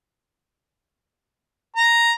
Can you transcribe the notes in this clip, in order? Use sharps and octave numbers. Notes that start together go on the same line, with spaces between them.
A#5